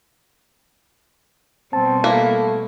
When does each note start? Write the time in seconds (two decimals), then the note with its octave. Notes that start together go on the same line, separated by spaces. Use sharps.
1.73 B2 G3 C4 A5
2.04 A3 A#3 E4